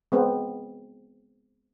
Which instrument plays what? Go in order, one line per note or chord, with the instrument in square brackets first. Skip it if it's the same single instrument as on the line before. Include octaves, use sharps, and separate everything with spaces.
[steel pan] G#3 B3 C4